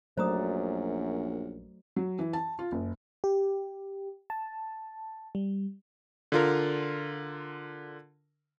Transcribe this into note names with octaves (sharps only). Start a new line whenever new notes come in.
A#1 F#2 F#3 A3 C5 D5 A#5 D#6
F#3
E3
A5
F4
F#1
G4
A5
G3
D3 F4 A#4